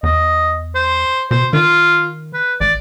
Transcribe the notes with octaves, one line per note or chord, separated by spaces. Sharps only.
E2 D#5
C5
B2 C5
D#3 F4
B4
A1 D5